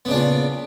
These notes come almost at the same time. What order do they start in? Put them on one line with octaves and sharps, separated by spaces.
B3 C#3 D4 A#2